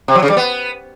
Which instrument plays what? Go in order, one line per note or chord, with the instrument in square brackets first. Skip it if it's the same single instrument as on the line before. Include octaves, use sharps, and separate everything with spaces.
[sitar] C3
F#3
C#3
G3
B3